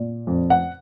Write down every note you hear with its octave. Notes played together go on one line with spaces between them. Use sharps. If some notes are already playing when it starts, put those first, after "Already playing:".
Already playing: A#2
F2
F#5